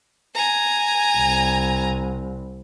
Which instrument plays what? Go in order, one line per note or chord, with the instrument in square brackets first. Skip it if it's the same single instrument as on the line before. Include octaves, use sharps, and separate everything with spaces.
[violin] G#5 A#5
[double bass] C2